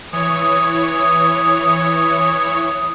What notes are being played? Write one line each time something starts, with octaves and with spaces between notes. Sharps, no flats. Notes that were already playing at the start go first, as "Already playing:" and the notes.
E3 C#5 D#6